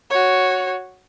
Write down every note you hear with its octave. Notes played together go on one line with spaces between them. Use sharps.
F#4 C#5